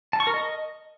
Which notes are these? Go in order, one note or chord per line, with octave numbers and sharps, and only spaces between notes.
A5
C#6
A#4
D#5